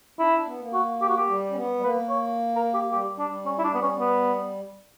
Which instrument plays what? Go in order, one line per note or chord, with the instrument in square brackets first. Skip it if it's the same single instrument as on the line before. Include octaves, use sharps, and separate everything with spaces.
[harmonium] D4 [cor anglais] E4
[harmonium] D4
B3
A#3
[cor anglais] F#4
G4
F#4
G4
[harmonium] A#3
G3
C#4
B3
G3
[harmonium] A#3 [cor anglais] B4
[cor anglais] C#5
A#4
G4
[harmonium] G3 [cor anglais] G4
[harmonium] G3
[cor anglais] D4
[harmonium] G3
[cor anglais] C#4
E4
D4
B3
C#4
B3